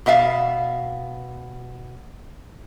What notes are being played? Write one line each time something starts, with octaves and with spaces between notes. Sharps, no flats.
B2 B3 E5 F5